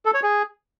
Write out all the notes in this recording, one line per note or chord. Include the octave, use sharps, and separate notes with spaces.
A4
C#5
G#4